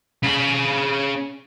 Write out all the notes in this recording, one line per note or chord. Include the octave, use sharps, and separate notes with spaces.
C#3 B5